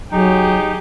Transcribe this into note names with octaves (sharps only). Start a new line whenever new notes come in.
F#3 D#4 G4 G#4